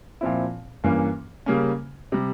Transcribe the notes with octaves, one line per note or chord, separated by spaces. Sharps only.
A#2 F3 C4 E4
G2 E3 A#3 C#4
C#3 G3 A#3 C#4
C3 G3